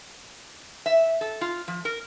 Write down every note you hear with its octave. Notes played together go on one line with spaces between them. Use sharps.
E5
A4
F4
F3
A#4